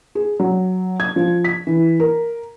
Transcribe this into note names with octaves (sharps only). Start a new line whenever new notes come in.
G#4
F#3
G#6
F3
B6
E3
A#4